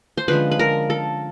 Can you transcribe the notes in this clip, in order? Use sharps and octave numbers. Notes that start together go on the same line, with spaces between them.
C5
D3 F3 G#3 C#4 B4
B4
A#4
A4